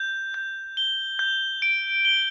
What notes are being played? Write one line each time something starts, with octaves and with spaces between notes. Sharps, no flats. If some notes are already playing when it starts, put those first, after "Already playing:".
Already playing: G6
G6
G7
G6
D7
G7